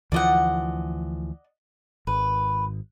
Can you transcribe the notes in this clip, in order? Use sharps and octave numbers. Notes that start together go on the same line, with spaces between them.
D2 E3 F3 D5 D#5 F#5
G#1 B4